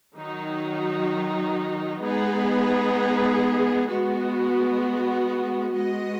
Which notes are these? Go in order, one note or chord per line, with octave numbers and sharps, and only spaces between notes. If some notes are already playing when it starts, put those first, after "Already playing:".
D#3 F#3 D#4 F#4
G#3 B3 D#4 G#4 B4
G#3 B3 F#4
G#3 B3 F#4 D#5